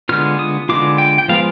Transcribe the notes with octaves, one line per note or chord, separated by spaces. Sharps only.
D3 G#3 B3 F4 F6
D#6
D3 G#3 B3 F4 D6
G5
G5
F3 G#3 B3 F4 F5